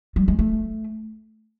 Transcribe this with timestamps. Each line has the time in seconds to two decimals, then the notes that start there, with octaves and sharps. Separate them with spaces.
0.16 G3
0.28 G#3
0.39 A3